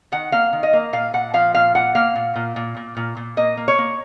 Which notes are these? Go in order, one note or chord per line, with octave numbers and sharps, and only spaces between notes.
D#3 F#5
A#3 F5
D#3
D#5
A#3
A#2 F5
A#2 F#5
F3 F5
A#2 F5
A#2 F#5
A#3 F5
A#2
A#2
A#2
A#2
A#2
A#2
A#3 D#5
A#3
C#5
A#3